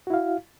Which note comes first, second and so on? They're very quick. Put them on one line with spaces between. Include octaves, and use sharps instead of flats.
F#4 E4 F5